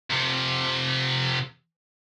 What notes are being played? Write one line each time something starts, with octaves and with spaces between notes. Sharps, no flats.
F2 C3